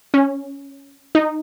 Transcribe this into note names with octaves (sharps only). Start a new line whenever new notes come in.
C#4
D#4